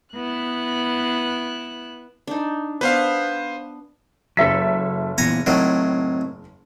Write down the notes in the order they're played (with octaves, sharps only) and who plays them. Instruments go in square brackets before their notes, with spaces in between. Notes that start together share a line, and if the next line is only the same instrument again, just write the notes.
[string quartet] B3 E4 F#6
[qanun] D4 D#4
[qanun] B3 D4 [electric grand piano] B4 C5 F5
[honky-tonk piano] F#1 E5 B6 [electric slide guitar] F#3 A4
[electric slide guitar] A#2 E3 B3 [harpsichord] G#5 A#5
[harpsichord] A2 D#3 F#3 [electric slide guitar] C4